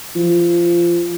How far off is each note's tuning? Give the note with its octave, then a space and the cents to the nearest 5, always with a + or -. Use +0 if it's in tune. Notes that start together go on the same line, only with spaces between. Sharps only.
F3 -20